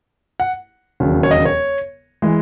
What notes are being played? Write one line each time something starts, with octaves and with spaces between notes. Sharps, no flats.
F#5
E1 D#2 C#3 F#3
C#5
D#5
C#5
E3 G#3